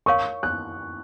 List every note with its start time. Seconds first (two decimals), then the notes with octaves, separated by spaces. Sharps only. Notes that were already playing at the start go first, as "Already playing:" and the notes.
0.06 A#4 C#5 F5 C#6
0.43 F#6